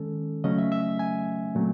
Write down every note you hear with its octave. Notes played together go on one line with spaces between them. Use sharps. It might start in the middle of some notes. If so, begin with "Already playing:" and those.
Already playing: D#3 G#3 C#4 A4
C#3 F#3 A3 C#4 D#5
E5
E5
G#5
A#2 F#3 A3 C4